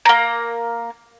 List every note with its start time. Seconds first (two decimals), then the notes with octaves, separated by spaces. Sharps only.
0.05 A#3 A#5